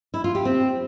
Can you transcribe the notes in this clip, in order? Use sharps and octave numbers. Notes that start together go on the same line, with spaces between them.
E4
F4
G4
C4